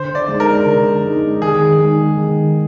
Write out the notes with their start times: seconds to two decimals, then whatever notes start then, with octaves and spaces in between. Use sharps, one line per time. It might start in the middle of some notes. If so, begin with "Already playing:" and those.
Already playing: D3 C5
0.15 D5
0.28 G#3 D#4
0.40 A#4
0.66 D3
1.04 G#3 D#4
1.42 D#3 G#4
1.79 G#3 D#4
2.18 D#3